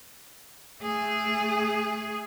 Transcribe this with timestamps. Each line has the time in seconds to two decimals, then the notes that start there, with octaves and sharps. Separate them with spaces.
0.80 A3 G#4